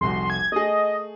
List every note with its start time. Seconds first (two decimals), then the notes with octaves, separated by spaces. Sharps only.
0.01 F1 C2 F#4 C6
0.30 G#6
0.52 A3 G#4 D#5